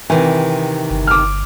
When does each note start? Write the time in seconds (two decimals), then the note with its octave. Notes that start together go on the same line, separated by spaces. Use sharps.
0.10 C3 D#3 E3
0.90 G1
1.07 D6 F6